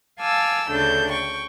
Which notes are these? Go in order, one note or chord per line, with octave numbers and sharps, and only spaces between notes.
F5 G#5 A5 D6 E6 F6
D2 C#3 D4 A4 G6
G5 C#6